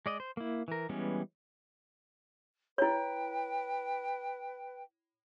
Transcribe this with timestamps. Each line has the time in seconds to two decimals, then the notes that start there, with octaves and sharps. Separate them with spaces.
0.06 G#3 D5 D#5
0.20 C5
0.37 A#3 E4
0.68 E3 A#4
0.89 E3 G3 G#3 B3 C#4
2.78 E4 B4 C#5 G5